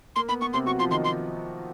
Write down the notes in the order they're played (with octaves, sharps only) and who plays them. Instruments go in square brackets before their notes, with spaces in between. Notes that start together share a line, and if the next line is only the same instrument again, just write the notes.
[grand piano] A#3 [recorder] C6
[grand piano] B3 [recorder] B5
[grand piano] B3 [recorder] C#6
[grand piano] C3 C4 [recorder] C6
[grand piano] F#3 F#4 [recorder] C#6
[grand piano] F3 F4 [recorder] C6
[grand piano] D#3 D#4 [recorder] C6
[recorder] C6